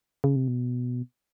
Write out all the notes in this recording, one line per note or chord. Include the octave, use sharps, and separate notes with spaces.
C#3
C3
B2